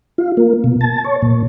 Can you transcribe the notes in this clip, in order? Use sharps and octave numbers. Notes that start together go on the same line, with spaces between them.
F4
A#3
B2
A5
C#5
A#2